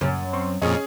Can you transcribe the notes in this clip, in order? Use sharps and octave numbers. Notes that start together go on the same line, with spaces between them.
F#2 A#2 C#3
C4 C6 C#6
F2 A#2 C#4 G#4 D#5 C#6 F6